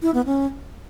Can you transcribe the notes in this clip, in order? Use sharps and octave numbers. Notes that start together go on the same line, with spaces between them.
E4
B3
C#4